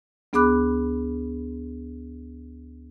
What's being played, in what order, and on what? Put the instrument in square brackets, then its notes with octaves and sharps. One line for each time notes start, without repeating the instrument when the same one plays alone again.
[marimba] D2 B3 G#4 B5 D6 F#6